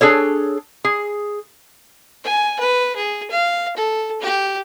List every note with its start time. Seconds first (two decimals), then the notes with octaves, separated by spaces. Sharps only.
0.01 D4 G#4 A4 C#5
0.85 G#4
2.24 G#5
2.60 B4
2.96 G#4
3.30 F5
3.76 A4
4.21 G4